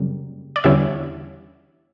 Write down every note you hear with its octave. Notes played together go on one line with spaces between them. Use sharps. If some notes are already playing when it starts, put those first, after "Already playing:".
Already playing: F#2 C#3 G3 A#3
D5
E2 D3 G3 C#4 E4 E5